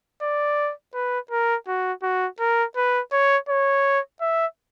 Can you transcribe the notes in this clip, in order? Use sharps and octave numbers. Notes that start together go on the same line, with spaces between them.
D5
B4
A#4
F#4
F#4
A#4
B4
C#5
C#5
E5